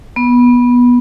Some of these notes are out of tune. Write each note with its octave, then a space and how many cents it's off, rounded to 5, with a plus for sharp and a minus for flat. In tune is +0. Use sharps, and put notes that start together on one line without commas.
B3 -15